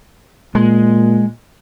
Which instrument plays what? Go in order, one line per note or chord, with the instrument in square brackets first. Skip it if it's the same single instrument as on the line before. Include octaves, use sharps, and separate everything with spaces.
[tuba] A#2 [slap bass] G#3